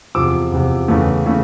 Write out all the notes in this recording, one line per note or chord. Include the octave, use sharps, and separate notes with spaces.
E2 C3 F3 D6 E6
E2 C3 F3
E2 C#3 E3 A3
C#3 E3 A3